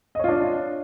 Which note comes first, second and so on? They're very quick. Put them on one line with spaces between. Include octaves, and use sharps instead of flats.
D#5 C#5 F4 D4